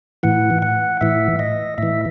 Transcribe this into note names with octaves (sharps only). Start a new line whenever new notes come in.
A2 E3 F#5
F#5
A2 E3 E5
D#5
A2 E3 E5